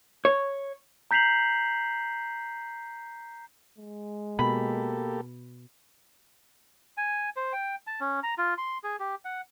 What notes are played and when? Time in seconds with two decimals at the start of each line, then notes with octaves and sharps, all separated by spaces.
0.25 C#5
1.11 A#5 G6 B6 C7 F7 F#7
3.78 G#3
4.39 B2 A#3 G4 A4 B5
6.97 G#5
7.36 C5
7.53 G5
7.87 A5
8.00 C#4
8.23 A#5
8.38 F4
8.58 C6
8.84 G#4
9.00 G4
9.25 F#5